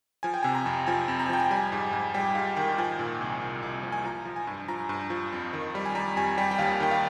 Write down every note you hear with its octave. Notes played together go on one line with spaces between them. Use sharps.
F3 G#5
G5
C3 G#5
A#5
F2
F3 G#5
F2
A#5
G#5
F3 G5
G#5
G3 G#5
G#2
G#2
G3 G5
G#2 F5
D#3 G5
G5
F3 G#5
A#2
C2
C2
C2
F3
G#5
F3 A#5
F3
G#5
G2
F3 A#5
G2
F3
F2
D#3
G3
G#5
G3 A#5
F2 G#5
G3 G5
G5
D#2 F5
D#3 G5
F5